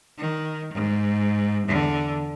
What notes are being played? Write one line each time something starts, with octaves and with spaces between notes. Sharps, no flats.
D#3
G#2
E2 D3